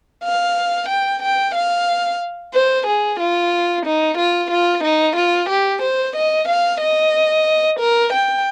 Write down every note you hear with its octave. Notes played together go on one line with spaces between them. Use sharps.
F5
G5
G5
F5
C5
G#4
F4
D#4
F4
F4
D#4
F4
G4
C5
D#5
F5
D#5
A#4
G5